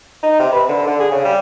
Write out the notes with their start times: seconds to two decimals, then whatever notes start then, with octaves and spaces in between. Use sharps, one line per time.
0.23 D#4
0.39 C3
0.52 B4
0.68 D3
0.87 D3
1.00 G#4
1.12 C#3
1.25 G3